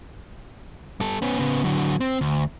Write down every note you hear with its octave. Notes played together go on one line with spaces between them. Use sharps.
G3 A4
B3 C#4
C#3 B3
D3 F#3
C4
D2